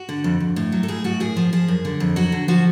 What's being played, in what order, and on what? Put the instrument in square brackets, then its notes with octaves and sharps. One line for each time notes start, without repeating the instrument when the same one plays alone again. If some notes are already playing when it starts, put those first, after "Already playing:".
Already playing: [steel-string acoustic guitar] F#4
D3
F2
F2
A2
F#3
A4
A2 G#4
A2 F#4
F#2 G#4
F3
F3 G#4
F#2
D3
F2
F#3 F#4
D3
F3 F#4